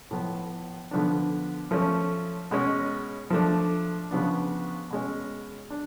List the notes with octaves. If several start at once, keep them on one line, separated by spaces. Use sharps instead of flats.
A2 F3 B3
D3 F3 B3 D4
F3 A3 C#4
B2 G#3 C#4
F3 A3 D4
C#3 F3 B3 D4
B2 G#3 C#4
D4